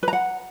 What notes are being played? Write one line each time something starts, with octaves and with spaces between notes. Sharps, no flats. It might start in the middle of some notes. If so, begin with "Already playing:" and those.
B4
A#5
F#5